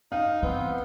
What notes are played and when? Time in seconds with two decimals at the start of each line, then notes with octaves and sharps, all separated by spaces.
0.12 D#4 F5
0.42 E3 B3 C4